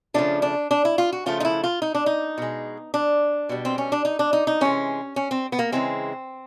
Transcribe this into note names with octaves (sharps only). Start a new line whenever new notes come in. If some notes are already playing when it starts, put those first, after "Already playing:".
C#3 F3 A3 D4
D4
D4
E4
F4
F#4
C#3 F3 A3 F4
D#4
E4
F4
D#4
D4
D#4
B2 G#3
D4
B2 G3
C4
C#4
D4
D#4
D4
D#4
D#4
C3 E3 G#3 C#4
C#4
C4
B3
A#3
C#3 E3 G#3 C4